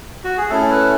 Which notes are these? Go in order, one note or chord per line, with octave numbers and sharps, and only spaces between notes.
F#4
G#4
A3 C#4 E4 A4
B4